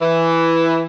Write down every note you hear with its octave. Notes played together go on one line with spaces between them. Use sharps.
E3